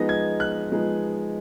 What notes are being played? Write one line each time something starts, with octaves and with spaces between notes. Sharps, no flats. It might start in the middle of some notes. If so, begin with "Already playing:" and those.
Already playing: F3 G#3 B3 D#4 A#6
G#6
F#6
F3 G#3 B3 D#4